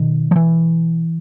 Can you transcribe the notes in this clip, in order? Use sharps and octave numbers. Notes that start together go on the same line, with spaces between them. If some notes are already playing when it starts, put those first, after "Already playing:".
Already playing: B2 D#3
F3
E3